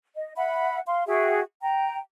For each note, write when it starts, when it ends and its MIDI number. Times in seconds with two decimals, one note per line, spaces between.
0.15 0.33 75
0.37 0.79 76
0.37 0.79 78
0.37 0.79 83
0.86 1.04 77
0.86 1.04 84
1.07 1.40 66
1.07 1.40 68
1.07 1.40 76
1.07 1.40 79
1.61 1.98 79
1.61 1.98 82